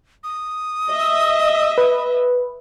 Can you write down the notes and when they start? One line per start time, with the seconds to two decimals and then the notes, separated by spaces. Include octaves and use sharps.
0.24 D#6
0.89 D#5 E5
1.78 B4